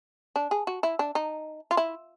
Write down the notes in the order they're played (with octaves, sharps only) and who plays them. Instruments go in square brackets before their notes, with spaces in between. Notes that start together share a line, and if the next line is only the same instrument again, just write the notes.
[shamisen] D4
G#4
F#4
E4
D4
D#4
F4
E4